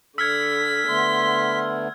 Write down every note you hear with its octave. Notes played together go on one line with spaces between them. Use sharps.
D3 E6 F6 G#6 B6
D3 A3 B3 C6